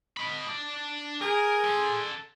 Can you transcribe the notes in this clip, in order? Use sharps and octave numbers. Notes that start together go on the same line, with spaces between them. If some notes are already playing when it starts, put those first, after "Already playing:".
D#5 B5
D4
G#4 A#4
A4 C6